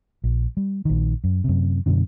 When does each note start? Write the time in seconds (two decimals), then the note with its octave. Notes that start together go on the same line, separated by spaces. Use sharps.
0.24 A#1
0.57 G3
0.85 A#1 D#3
1.24 F#2
1.44 F#2 C3
1.86 F#2 B2 D3